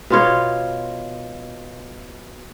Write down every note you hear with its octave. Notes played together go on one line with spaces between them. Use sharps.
B2 F4 C#5